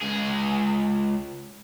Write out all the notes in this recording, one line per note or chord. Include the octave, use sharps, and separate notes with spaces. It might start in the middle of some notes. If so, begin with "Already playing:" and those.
C#2 G#4